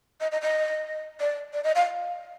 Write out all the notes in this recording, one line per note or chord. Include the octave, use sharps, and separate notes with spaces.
D#5
D#5
D#5
D5
D5
D#5
F5